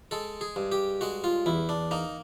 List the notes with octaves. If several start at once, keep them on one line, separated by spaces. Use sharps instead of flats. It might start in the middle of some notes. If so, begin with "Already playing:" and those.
G#3 A4
G#4
G2
G4
G#3 F#4
F4
E2 E4
D4
A#3 D#4